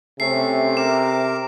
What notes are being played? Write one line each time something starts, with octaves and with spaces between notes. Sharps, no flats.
C3 A3 C#4 A4 C7
A#4 A#5 D6 E7